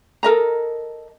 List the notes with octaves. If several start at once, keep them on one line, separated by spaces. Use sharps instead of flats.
A4 A#4 D#5 A#5